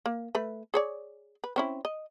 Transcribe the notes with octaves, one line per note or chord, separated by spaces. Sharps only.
A#3
A3 B4
G#4 C#5 D5
B4
C4 C#4 E4
D#5